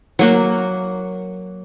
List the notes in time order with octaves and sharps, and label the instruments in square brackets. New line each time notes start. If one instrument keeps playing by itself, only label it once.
[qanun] F#3 A#3 F#4